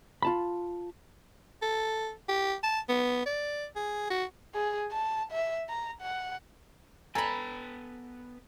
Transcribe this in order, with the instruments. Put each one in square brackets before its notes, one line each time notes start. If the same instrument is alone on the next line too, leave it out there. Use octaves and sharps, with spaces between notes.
[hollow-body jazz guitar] F4 A5 B5
[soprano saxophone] A4
G4
A5
B3
D5
G#4
F#4
[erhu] G#4
A5
E5
A#5
F#5
[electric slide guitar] B3 B4 G5 [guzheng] A4 B5 [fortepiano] G#5 A#5